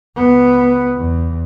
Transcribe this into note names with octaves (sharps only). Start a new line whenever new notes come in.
C#2 B3
E2